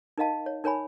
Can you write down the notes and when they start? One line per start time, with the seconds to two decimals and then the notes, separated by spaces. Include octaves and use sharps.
0.18 D#4 A#4 D#5 F5 A5
0.46 C#5
0.64 D#4 A#4 C#5 G#5 B5